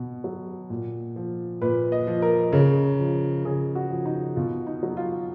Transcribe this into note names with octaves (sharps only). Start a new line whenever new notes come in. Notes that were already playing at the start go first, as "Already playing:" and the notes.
Already playing: B2
F#3
A#2
F3
A#2 B4
D#5
F3
A#4
C#3
F3
C#3 G#4
F#4
F3
D#4
B2 F4
D#4
F#3
F4